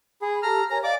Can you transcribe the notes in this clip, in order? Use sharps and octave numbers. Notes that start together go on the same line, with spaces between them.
G#4 B5
G4 A4 A5 A#5 F6
A#4 C#5 G#5 A#5
D5 D#5 F5 D6